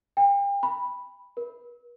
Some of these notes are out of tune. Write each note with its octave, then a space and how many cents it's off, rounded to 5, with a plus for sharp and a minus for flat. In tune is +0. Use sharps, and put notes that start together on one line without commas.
G5 +40
B5 -5
B4 -35